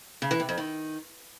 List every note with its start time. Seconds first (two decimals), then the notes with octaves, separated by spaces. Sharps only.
0.22 C#3
0.31 E3
0.40 C3
0.49 F2
0.58 D#3